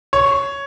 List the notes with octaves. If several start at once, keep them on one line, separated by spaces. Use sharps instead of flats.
C#5